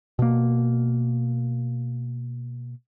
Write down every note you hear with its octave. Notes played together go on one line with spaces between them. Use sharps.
B2 A#3